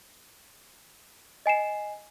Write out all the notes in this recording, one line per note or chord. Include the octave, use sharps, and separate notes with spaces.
D#5 G#5 C7 E7